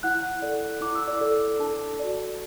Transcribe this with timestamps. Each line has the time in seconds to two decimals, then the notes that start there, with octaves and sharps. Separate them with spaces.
0.03 E4 F#5 F#6
0.42 A4 D5
0.81 E4 D6
0.95 E6
1.07 D5 D6
1.21 A4 D5
1.60 D4 A4 A5
1.99 F#4 D5